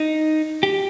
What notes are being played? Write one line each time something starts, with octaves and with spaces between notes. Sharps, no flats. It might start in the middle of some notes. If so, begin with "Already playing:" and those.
Already playing: D#4
G4